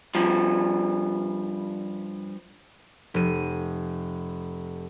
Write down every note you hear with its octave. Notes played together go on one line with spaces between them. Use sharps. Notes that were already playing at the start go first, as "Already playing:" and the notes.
G2 F3
F1 D#7